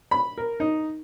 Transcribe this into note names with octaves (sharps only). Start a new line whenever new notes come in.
B5
A#4
D#4